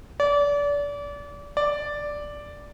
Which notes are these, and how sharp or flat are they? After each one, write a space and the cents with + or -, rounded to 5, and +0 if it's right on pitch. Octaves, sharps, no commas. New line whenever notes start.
D5 -30
D5 +0